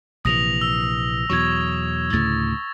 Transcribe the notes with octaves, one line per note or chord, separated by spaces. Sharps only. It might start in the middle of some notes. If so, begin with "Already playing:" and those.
A#1 C3 E3 D#6 A#6 F7
E6
E2 B2 F#3 C#6 G#6
D2 A2 C#3 A6